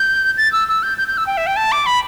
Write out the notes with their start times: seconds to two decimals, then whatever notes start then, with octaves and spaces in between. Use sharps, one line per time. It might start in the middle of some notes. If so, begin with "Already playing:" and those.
Already playing: G6
0.37 A6
0.52 E6
0.68 E6
0.83 G6
0.98 G6
1.08 G6
1.17 E6
1.27 G5
1.37 E5
1.47 G5
1.56 A5
1.72 D6
1.86 B5